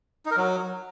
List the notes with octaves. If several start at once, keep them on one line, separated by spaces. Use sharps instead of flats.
D#4
A#4
F#3